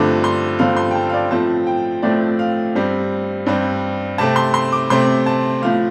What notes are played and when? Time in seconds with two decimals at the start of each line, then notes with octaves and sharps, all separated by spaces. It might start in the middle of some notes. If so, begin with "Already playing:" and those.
Already playing: G2 D3 F3 A3 C4 D6
0.24 C6
0.59 G2 D3 F3 A3 C4 F5
0.77 C6
0.91 G5
0.95 A5
1.09 F5
1.13 D5
1.31 A2 F3 A3 C4 A5
1.67 G5
2.02 A2 F3 A3 C4 D5
2.39 F5
2.75 G2 G3 C4
3.46 G2 G3 C4
4.18 C3 A3 C4 A5
4.36 C6
4.54 C6
4.72 D6
4.90 C3 A3 C4 C6
5.26 A5
5.62 A2 F3 A3 F5